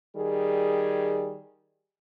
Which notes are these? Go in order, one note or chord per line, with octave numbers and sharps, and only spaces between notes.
D#3 G3 G#4